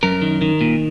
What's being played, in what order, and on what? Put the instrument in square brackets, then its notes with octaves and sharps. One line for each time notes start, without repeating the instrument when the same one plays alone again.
[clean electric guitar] F#2 A#4
D#3
D#3
A#2